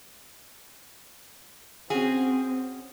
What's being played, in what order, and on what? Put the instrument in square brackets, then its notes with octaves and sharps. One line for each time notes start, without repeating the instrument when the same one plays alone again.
[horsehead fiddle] C4 [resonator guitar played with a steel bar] C#4 F#4 G#4